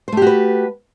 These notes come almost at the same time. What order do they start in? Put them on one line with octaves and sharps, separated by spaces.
C5 A3 G4 F#4 B4